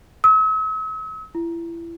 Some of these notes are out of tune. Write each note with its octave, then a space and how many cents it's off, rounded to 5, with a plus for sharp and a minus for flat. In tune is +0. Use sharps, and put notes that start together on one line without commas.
E6 -45
E4 +30